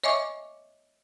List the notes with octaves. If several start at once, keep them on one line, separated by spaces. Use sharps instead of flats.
C#5 D#5 E5 G#5 C#6 D6